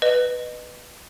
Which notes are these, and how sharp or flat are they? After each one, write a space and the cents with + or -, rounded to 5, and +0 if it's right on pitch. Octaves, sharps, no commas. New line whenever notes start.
B4 +0 D#5 -25